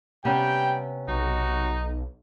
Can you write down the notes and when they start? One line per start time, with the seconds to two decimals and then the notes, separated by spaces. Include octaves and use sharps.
0.25 C3 G3 B3 C#4 G5
1.08 B1 D#4 F#4